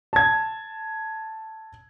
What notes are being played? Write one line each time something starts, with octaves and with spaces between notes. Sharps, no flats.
A5 G#6